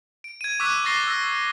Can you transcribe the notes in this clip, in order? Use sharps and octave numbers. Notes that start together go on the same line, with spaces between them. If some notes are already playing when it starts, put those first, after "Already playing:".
D7
G#6 D#7
C#6 D6 E6 F#6 B6 D#7
C#6 D6 A6 A#6 C7 G7
E6 A#6